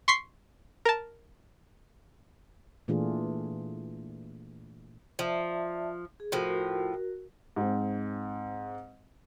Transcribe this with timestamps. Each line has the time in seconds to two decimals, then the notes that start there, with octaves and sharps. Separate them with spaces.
0.08 C6 C#6 B6 C7
0.85 A#4 A5
2.88 A#2 E3 A3 D4 F4 G#4
5.19 F3 D5 E5 A5
6.20 G#4
6.32 A2 F3 F#4 A#4
7.56 G#2 C4